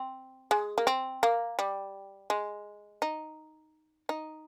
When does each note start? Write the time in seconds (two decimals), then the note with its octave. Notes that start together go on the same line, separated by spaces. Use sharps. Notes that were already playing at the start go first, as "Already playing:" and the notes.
Already playing: C4
0.51 G#3
0.78 A#3
0.87 C4
1.23 A#3
1.59 G3
2.30 G#3
3.02 D#4
4.09 D#4